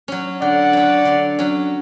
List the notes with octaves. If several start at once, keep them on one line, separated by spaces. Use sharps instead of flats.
F#3 C#4
D3 D5 F#5
F#3 C#4
D3
F#3 C#4